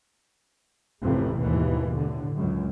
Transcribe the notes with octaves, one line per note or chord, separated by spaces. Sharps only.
A1 F2 A2 C3 E3
D#2 G#2 B2 E3
A2 D3
C#2 F#2